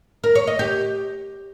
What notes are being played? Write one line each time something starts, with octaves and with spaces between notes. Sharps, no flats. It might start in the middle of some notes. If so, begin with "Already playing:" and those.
A#4
C#5
D#5
G4